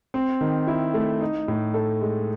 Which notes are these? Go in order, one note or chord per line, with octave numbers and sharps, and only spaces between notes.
C4
D#3
E4
A3
D#4
A2
A4
G#3